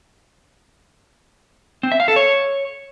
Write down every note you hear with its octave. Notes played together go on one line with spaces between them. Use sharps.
C4
E5
F5
A4
C#5